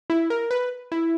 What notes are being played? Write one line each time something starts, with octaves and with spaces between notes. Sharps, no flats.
E4
A#4
B4
E4